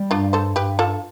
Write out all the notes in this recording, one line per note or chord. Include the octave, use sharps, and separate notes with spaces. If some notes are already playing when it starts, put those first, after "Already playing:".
Already playing: G3
G2 D4 F4
A4 C5
G2 G4 B4
F4 A4